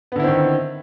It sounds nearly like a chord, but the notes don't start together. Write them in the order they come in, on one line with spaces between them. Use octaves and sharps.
B3 D3 E4 C4 D#3